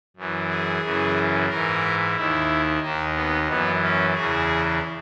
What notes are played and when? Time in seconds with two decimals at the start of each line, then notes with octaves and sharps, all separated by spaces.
0.16 F#2 E3
0.49 G#4
0.82 F#2 C#3 E3
1.49 G#2 E3 A#4
2.15 D#2 D#3 E4
2.82 D#2 D#3 D#4
3.15 B3
3.48 F#2 E3 B3
3.82 C#4
4.14 E2 C#3 E3 G#4